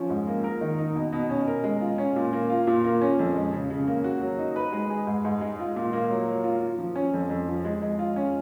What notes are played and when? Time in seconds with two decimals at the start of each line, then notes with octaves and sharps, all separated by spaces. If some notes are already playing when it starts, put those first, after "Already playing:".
Already playing: F3 C#4
0.10 G#2
0.27 A#3
0.44 A#4
0.61 D#3
0.78 D#4
0.95 B2
1.13 B2
1.30 C#4
1.47 A#4
1.64 G#3
1.81 F4
1.98 C#4
2.16 A#2
2.33 A#3
2.50 F4
2.67 A#2
2.84 A#3
3.02 C#4
3.19 F2
3.36 G#3
3.53 C#3
3.70 C#3
3.87 A#3
4.04 F#4
4.22 F#3
4.38 D#4
4.56 B4
4.72 G#3
4.90 G#4
5.07 G#2
5.25 G#2
5.41 G#3
5.59 F4
5.76 A#2
5.93 A#3
6.10 F#3
6.28 F#3
6.44 F4
6.61 F4
6.79 F3
6.96 C#4
7.14 F2
7.30 F2
7.47 F3
7.65 G#3
7.82 G#3
7.99 F4
8.16 C#4